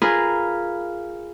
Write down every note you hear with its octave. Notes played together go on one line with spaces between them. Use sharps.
F4 G#4 A#4 B4